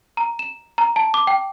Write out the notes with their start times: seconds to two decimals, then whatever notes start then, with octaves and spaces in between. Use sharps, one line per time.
0.17 A#5
0.39 E7
0.78 A#5
0.96 A5
1.14 D6
1.27 G5